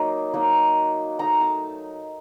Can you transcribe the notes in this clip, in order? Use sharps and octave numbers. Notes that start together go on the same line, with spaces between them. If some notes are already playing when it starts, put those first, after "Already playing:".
Already playing: F#3 A#3 D#4
F#3 A#3 D#4
A3 D#4 A#5
A5